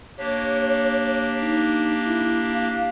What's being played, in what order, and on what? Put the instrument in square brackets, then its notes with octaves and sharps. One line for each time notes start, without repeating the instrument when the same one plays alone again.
[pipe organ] A#3 D4 G4 [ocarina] C#5
[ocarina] D#4
E4
F5